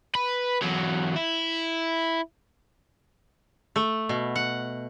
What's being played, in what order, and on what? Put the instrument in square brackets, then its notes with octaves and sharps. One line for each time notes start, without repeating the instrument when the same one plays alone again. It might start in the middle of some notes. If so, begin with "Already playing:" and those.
[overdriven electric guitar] B4
E2 F#3
E4
[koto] A3
B2
F#5